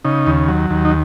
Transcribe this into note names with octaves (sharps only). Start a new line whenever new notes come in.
C#3 D#4
D#2
F#3
D#2
D#4